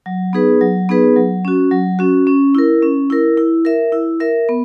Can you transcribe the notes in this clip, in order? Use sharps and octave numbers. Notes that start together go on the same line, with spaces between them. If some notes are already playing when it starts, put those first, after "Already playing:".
F#3
B3 D#4 G#4 B4
F#3
B3 D#4 G#4 B4
F#3
C#4 F#4
F#3
C#4 F#4
C#4
E4 A#4
C#4
E4 A#4
E4
A#4 E5
E4
A#4 E5
B3